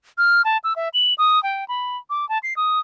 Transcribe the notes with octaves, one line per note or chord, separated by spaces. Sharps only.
F6
A5
E6
E5
F#7
D#6
G5
B5
D6
A5
C7
D#6